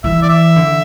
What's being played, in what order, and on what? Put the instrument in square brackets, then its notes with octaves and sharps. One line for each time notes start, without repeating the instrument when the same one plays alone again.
[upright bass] E3 [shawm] E5
[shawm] D5
E5
[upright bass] D3